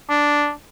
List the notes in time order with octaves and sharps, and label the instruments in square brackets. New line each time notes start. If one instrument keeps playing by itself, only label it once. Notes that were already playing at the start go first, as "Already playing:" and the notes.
[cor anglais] D4